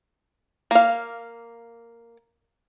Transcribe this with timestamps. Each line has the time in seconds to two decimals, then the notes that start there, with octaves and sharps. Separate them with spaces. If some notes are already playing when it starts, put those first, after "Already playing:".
0.71 A#3 F5